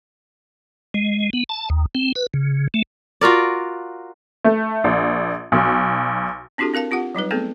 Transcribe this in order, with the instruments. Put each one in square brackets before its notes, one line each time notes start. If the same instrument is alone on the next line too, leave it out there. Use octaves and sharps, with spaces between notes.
[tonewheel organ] G#3
B3
A5
D#2
C4
B4
C#3
A3
[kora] F4 F#4 A#4 D5
[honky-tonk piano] A3
A#1
B1
[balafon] C4 D4 E4 F#4 G4 A4
C4 A#4 F5 A5
C4 F4 G4 F#5
F#3 G3 D#4 B4
A3 B3 C4 G#4 A4